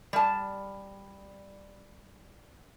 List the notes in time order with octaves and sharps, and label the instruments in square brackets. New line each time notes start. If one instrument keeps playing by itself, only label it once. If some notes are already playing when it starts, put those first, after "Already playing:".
[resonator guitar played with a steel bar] G3 A5